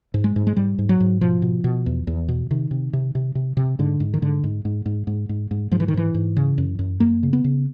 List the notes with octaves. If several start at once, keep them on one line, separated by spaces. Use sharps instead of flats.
G#2
G#3
G#2
G#3
G#2 G3
G#2
F#3
G#2
B2 F3
B2
B2
E2
E2
B2
C3 D#3
C3
C3
C3
C3
C3
G#2 D3
G#2
D#3
G#2 D3
G#2
G#2
G#2
G#2
G#2
G#2
G#2 F3
E3
D#3
G#2 E3
G#2
C#3
F#2
F#2
F#2 A#3
C#3
B3
C#3